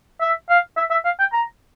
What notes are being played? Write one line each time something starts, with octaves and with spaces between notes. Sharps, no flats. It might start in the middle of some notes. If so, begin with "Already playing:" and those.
E5
F5
E5
E5
F5
G5
A#5